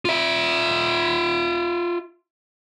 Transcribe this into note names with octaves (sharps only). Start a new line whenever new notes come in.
F4 E5